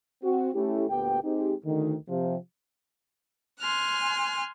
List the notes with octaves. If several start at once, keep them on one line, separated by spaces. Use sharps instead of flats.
C4 F#4
A3 C#4 E4 G4
D2 A#2 B3 G4 G5
G#3 C4 D#4 G4
D2 D#3
C3 F3
G#5 C6 F6 F#6